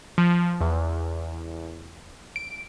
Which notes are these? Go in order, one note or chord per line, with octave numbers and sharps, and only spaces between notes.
F3
E2
D7